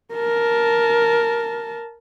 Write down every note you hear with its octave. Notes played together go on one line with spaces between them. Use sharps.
A#4 A5